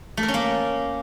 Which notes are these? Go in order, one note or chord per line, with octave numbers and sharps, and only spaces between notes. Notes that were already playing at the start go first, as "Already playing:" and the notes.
A3
A#4
C#4
A#3